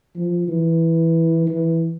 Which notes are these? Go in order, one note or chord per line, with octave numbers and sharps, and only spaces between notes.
F3
E3
E3